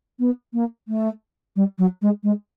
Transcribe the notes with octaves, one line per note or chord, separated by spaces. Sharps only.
B3
A#3
A3
G3
F#3
G#3
G#3